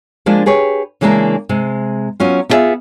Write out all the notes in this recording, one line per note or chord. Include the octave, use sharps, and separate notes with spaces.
F3 G#3 A#3 D4 F4
G4 G#4 B4 C#5
C#3 E3 G#3 A#3 D4 A#4
C3 G#3
F#3 B3 C#4 F4
B3 E4 F4 G#4 E5